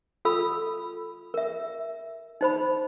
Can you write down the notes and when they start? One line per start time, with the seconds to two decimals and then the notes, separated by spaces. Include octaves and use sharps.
0.25 F4 A4 B5 E6
1.34 A#4 E5
2.41 D#4 C5 B5